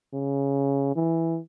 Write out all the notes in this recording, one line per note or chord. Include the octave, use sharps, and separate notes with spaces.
C#3
E3